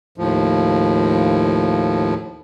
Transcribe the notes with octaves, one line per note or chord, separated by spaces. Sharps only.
D#2 A2 F3